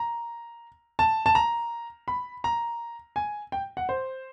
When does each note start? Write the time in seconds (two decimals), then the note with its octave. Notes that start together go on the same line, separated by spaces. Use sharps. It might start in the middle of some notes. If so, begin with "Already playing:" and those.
Already playing: A#5
0.99 A5
1.26 A5
1.35 A#5
2.08 B5
2.44 A#5
3.16 G#5
3.52 G5
3.77 F#5
3.89 C5